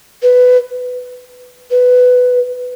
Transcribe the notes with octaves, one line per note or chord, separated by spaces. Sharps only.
B4
B4